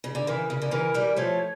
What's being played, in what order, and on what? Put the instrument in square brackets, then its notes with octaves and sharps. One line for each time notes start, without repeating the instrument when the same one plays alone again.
[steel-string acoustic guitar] C#3
D3
[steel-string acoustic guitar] C#3 E3 [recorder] A#4
[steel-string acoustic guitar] C#3
D3
[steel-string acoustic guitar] C#3 E3 [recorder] A#4
[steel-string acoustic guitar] E3 G3
[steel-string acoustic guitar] F3 A3 [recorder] C#5